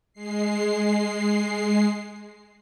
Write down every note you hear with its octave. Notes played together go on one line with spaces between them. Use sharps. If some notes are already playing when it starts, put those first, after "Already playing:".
G#3 C7